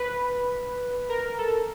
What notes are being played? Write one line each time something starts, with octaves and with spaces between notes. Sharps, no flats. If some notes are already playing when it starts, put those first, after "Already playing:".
Already playing: B4
A#4
A4